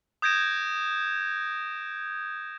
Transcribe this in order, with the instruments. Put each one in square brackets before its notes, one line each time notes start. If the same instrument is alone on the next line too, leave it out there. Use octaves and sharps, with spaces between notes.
[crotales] D#6 G6 G#6 A#6 D7 E7